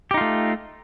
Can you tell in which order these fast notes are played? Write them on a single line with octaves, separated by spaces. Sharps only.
G4 D#4 F4 A3